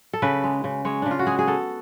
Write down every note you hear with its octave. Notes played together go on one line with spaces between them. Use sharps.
A4
C#3 B4
G#3
C#3
G#3 C#5
C#3 D4
F4
F#4
G#3 G#4
G#4
B3 A4